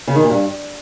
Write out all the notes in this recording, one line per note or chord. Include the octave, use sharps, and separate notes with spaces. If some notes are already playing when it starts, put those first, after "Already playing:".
C#3
D#3
A#2
G2